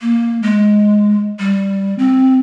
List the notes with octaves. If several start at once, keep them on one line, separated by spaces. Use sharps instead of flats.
A#3
G#3
G3
C4